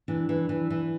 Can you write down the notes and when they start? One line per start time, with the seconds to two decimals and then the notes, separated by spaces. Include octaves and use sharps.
0.08 E3 D4
0.29 E3
0.49 E3
0.70 E3